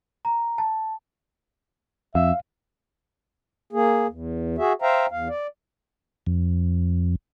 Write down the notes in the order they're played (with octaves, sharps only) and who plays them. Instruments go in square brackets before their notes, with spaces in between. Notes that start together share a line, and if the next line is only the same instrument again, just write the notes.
[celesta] A#5
A5
[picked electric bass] F2 [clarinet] E5 [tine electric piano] F5
[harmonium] A#3 G#4
E2
F#4 G#4 E5
C5 E5 F5 G5 A#5
E2 F5
D5
[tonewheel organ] F2